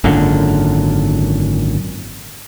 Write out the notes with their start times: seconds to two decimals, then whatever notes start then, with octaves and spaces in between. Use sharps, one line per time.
0.04 G#1 F#2 A#2 D3